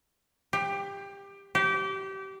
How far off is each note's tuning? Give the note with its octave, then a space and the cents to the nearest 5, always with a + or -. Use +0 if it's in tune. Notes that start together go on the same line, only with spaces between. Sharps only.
G4 +20
G4 -25